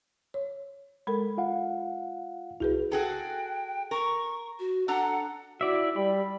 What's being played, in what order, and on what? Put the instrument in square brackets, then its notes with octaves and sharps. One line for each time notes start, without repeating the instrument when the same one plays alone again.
[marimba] C#5
[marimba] G#3 A4 A#4 [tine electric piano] B5
[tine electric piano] F4 F5 F#5
[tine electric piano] C2 E4 [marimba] F#4 G#4 B4
[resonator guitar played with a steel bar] F#4 G#4 A4 [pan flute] G5
[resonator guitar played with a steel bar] A#4 [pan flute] C#6
[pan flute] F#4
[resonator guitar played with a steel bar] D4 A4 A#5 [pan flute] F#5
[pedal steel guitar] E4 D5 E5 [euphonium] F#4
[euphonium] G3 [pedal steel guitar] B5